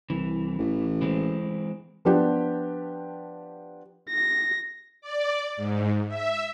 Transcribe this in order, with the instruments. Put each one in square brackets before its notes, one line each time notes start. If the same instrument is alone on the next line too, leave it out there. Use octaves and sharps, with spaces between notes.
[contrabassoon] C2 [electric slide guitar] E3
[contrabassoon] A1
[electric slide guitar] E3 G#3 C4
[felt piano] F3 B3 D4 G4
[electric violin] A#6
[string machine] D5
G#2
E5